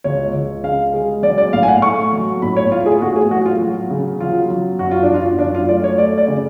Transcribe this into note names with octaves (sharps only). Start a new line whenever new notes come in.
C#2 C#5
C#2
C#3 F5
G#3
F#3 D5
D5
A2 F5
G#5
F#5
A3 C#6
F#3
A2 B5
C#5
A3 F4
G#4
A2 F#4
G#4
F#3 F#4
F4
F#3
C#3
F#3 F4
F#3
F#2 F#4
F4
D4
F#2 F4
F#2 D4
F4
A3 D5
C#5
A3 D5
D5
C#3